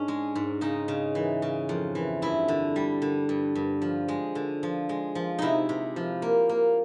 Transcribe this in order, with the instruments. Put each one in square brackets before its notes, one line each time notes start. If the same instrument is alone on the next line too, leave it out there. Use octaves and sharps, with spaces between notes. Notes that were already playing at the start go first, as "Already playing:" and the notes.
Already playing: [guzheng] G#2 C#4 D4
G#3
G#2
C#3 D#4
C#3
E3
C#3
F2
E3
G2 E4
D3
G3
D3
G2
G2
F3
G#3
D3
F3
G#3
F3
C3 D#4 E4
C3
F3
A#3
A#3